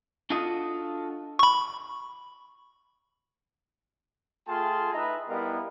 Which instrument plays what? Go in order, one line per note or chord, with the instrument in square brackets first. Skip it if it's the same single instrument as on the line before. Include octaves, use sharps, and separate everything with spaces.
[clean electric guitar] D4 F4 F#4 A4 D#5
[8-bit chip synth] B5 C#6
[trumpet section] A3 F4 G#4 G5 A5 C6
D#4 E4 B4 D#5 E5 A#5
G3 B3 E4 A#4 D#5 F5